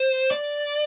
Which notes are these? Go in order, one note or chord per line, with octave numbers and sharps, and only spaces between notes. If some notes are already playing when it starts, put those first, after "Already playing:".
Already playing: C5
D5